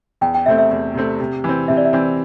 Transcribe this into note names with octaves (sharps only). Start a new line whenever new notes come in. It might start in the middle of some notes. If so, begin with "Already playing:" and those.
E2 G5
G5
C3 A3 C4 E5
E5
E2
C3 A3 C4
C3
E3 C4
C3 E5
D5
E5
E3 C4